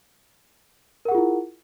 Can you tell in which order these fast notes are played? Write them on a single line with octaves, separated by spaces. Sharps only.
A#4 F#5 G#4 F4 E4